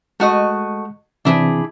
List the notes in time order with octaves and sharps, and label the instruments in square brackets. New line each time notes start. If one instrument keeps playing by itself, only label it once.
[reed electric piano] G#3 [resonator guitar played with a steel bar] A3 F#4 D#5
[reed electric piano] C3 E3 C4 [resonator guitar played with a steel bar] D4 E4 G#4